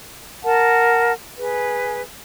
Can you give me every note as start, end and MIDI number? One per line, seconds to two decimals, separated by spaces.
0.44 1.12 70
0.44 1.12 78
0.44 1.12 81
1.38 2.02 68
1.38 2.02 71